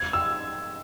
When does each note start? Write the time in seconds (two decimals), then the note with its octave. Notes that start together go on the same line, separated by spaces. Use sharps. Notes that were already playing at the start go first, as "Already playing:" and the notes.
Already playing: G#6
0.13 E6